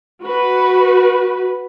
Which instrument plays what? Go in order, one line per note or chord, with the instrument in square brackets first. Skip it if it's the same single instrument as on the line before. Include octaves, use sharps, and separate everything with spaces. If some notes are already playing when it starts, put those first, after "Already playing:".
[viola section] F#4 B4